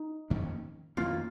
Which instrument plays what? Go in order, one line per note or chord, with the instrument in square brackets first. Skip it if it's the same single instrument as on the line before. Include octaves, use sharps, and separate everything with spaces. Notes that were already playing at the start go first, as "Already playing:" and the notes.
Already playing: [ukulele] D#4
[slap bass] F2 D#3 A#3 C#4
[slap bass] F2 D#3 A#3 C#4 [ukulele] F4